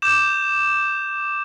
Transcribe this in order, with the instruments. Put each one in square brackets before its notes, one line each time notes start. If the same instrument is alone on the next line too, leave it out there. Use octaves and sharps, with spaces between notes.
[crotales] D6 G6 E7